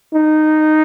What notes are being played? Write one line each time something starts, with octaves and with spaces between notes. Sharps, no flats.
D#4